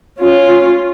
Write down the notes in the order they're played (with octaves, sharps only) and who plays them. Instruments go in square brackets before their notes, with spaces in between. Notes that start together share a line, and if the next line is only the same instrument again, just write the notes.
[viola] C#4 F4